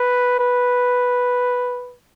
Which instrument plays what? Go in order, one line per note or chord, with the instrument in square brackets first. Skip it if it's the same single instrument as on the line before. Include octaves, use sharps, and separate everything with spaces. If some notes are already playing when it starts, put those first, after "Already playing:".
Already playing: [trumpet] B4
B4